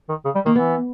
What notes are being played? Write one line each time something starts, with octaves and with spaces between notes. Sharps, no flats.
D#3
C#3
G3
D#3 A#3
E3 B3